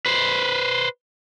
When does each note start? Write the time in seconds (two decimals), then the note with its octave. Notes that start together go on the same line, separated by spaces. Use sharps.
0.06 B4 C5